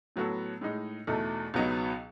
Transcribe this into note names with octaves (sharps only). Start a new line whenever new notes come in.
A2 F#3 B3 F#4 A4
A2 G#3 D#4
E2 B2 A3 D#4 A4
C#2 B2 F#3 B3 D#4